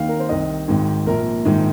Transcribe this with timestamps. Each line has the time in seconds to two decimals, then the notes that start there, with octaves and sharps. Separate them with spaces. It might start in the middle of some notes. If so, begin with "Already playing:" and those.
Already playing: D#2 D#3 F5
0.09 A#4
0.20 C5
0.29 C2 C3 D#3 D#5
0.68 G#1 G#2 D#3
1.06 A#1 A#2 A#4
1.45 A#1 G#2 D#3